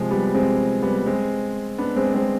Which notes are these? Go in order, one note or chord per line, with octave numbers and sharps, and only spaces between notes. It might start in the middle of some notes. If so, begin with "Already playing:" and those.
Already playing: C3 F3 G#3
G3 B3
G#3 C4
G3 B3
G#3 C4
B3 D4
G#3 C4
G#3 C4